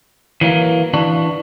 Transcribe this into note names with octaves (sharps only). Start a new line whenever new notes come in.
E3 F#3 A#3
E3 D4 F#4